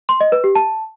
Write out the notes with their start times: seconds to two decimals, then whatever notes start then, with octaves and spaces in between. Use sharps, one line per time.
0.09 C6
0.21 D#5
0.32 B4
0.44 G4
0.55 A5